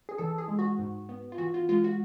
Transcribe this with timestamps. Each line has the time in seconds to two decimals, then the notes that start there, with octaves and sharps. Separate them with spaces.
0.09 G#4
0.18 E3 A4
0.38 G#4
0.48 G#3
0.59 F#4
0.79 G#2
1.09 B3
1.32 F4
1.38 E3 F#4
1.54 F4
1.69 G#3 F4
1.84 F#4